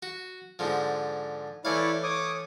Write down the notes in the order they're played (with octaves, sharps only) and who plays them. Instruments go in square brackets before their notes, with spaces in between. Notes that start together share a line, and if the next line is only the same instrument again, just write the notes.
[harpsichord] F#4
G#2 D3 F3
[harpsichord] E3 A3 F5 [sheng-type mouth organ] E4 C#5 D5
[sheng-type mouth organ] C#5 D6 D#6